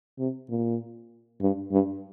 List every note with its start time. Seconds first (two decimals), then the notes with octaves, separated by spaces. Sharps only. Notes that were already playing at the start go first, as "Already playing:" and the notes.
0.19 C3
0.49 A#2
1.41 G2
1.71 G2